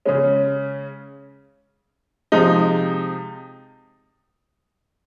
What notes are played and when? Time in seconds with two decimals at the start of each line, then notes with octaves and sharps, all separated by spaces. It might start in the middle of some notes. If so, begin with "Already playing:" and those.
0.05 C#3 G#3 C#4
2.32 C3 F3 G#3 D#4